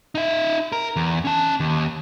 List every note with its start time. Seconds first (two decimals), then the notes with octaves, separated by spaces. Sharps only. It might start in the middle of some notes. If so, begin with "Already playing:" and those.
0.15 D#4 E5
0.72 A#4
0.96 E2
1.25 C#4 A5
1.60 D#2